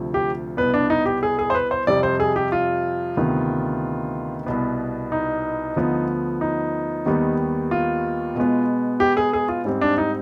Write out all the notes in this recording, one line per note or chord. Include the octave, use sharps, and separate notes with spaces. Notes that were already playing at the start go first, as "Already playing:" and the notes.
Already playing: D2 C3 F3
G4
C2 B2 B3 B4
D4
D#4
G4
G#4
G#4
C5
B4
C5
F2 C3 G3 D5
C5
G#4
G4
F4
D2 C3 D#3 B3
C2 B2 B3
D#4
D2 D3 F3 B3
D#4
D#2 D#3 G3 B3
F4
B2 G#3 B3
G4
G#4
G#4
F4
G#2 G3 C4
D4
D#4